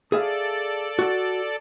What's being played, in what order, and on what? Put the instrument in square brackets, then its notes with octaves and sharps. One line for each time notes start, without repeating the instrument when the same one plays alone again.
[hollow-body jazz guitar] G#4 E5 F5 [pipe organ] A4 D5
[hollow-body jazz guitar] F#4